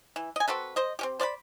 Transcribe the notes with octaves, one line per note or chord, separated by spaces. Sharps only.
E3
D#5 G#5
C4 F#4 A4 B4
C5 D#5
C4 C#4 G4
C5 D5 F#5 B5